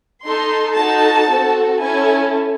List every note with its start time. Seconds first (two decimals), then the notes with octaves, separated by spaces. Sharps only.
0.25 D#4 A4 C6
0.76 D#4 F#4 A4 A5
1.28 C4 F#4 A4
1.81 C#4 E4 A4 G#5